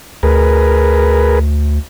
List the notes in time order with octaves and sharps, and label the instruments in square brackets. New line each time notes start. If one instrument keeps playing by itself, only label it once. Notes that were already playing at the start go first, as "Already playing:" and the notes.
[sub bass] D2 [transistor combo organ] G#4 A#4 B4